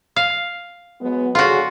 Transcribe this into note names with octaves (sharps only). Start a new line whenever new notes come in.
F5
F#3 G#3 B3
D3 F#3 F4 F#4 G#4